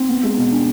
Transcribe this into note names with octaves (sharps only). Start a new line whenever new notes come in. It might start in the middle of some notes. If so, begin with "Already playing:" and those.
Already playing: C4
B3
G#3
B2
D4